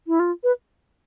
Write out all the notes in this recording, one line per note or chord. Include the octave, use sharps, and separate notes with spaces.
E4
F4
B4